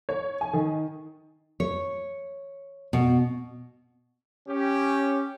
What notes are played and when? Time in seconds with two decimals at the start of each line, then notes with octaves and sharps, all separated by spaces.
0.09 C#5
0.41 G#5
0.53 D#3
1.60 C#5
2.93 B2
4.48 C#4 G4